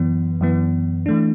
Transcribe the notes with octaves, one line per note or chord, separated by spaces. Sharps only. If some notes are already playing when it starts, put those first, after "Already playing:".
Already playing: F#2 E3 B3
F#2 E3 B3
E3 A3 D4